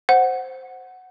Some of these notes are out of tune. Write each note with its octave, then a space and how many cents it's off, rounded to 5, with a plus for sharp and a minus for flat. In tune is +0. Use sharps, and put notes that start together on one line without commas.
C5 +0 F#5 +0